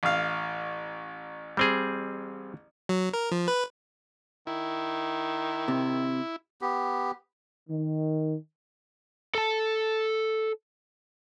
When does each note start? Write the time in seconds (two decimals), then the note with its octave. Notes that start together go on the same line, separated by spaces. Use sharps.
0.03 A1 F5
1.57 G3 C4 G#4
2.89 F#3
3.14 A#4
3.32 F3
3.48 B4
4.47 D#3 E4
5.68 C3
6.61 B3 G4
7.69 D#3
9.35 A4 A5